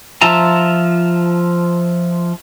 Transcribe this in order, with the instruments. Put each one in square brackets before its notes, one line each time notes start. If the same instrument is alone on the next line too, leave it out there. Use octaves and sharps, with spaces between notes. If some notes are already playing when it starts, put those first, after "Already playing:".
[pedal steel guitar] F3 F4 E5 A5 A#5